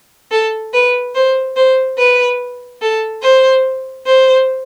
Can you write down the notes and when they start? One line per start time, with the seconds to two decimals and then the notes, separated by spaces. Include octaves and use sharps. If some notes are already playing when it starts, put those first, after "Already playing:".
0.31 A4
0.73 B4
1.14 C5
1.55 C5
1.97 B4
2.81 A4
3.22 C5
4.05 C5